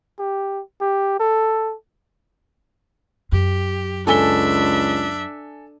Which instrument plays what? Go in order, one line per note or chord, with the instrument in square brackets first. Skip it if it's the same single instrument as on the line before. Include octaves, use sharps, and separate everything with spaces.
[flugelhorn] G4
G4
A4
[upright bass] F#2 [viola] G4
[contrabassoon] C#2 [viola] D4 E5 [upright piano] A4 G#5 G7